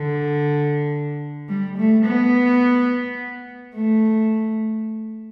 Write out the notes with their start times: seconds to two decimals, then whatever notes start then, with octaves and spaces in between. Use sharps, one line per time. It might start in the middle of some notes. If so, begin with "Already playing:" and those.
Already playing: D3
1.49 G3
1.78 A3
2.06 B3
3.75 A3